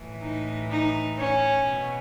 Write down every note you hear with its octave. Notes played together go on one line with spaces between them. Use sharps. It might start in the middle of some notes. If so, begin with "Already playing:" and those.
Already playing: A2 E3
D#4
D#4
C#4
B2